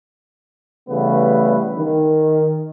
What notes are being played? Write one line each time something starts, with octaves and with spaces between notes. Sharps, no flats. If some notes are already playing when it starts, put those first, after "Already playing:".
C#3 E3 G3 A3 B3 B4
D#3